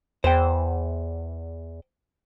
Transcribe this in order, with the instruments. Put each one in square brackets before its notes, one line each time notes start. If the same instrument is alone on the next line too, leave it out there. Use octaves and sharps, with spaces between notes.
[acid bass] E2 [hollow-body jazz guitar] C5 G5